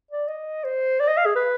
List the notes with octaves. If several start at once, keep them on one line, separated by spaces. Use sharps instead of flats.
D5
D#5
C5
D5
D#5
F5
G#4
B4